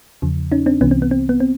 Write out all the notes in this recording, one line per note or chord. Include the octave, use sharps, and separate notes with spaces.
E2 C#3 F3
C#4 D#4
C4 D4
C2 C3 E3 B3 C#4
C4
B3
C4
B3
C4